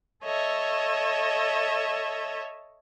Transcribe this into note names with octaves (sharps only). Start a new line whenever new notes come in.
A4 C#5 D#5 E5